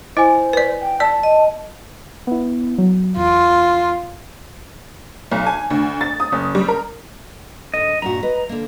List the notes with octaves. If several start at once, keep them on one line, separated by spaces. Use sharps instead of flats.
E4 C5 D#5 G#5
B4 D5
G5
D5 A5 E6
D#5
B3 E4
F#3
E2 F4
B1
G#5
D2
A6
D#6
F#1
G3
A#4
G#2 D3 D#5
G2 A#2 F#4 A#5
B4 D#5
D3 A#3